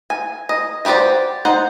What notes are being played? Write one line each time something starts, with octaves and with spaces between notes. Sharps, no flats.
G#5
D#5
F#4 G4 B4 C5 D5
D#4 C5 F#5